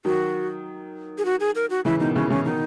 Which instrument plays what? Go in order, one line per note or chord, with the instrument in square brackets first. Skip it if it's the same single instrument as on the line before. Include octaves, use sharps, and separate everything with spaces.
[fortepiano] D#3 F#3 [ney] F#4
[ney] G#4
F#4
G#4
A#4
F#4
[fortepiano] C#3 E3 [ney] E4
[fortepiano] B2 D#3 [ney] D#4
[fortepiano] C#3 E3 [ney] C#4
[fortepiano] C#3 E3 [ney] C#4
[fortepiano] B2 D#3 [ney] D#4